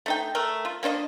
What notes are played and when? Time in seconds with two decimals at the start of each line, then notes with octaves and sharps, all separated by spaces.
0.06 A3 D#4 G5
0.35 A3 A#4
0.65 F4
0.83 A#3 D4 C5 D#5